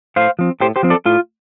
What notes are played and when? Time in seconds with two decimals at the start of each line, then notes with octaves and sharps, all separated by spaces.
0.16 A2 C5 F5
0.39 F3 C4
0.61 A2 G4 C5
0.76 G4 C5
0.83 F3 C4
0.90 A4 D5
1.06 A2 F4